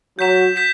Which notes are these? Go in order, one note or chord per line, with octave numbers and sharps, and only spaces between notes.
F#3 G6 B6 E7
G6 B6 E7